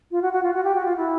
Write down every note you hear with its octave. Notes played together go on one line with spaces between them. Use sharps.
F4
F#4
F#4
F4
F#4
G4
F#4
F4
E4